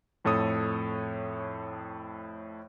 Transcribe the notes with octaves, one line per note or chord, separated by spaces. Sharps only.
F2 A2 A4 C#5 D#6